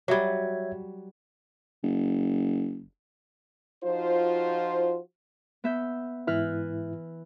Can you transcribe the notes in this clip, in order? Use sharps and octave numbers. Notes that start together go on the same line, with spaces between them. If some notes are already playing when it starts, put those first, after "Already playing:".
F#3 G3 C#5 E5 G#6
F#1
F3 D#4 F4 F#4 C5
B3 E5 G6
G#2 E3 E4 B4 F6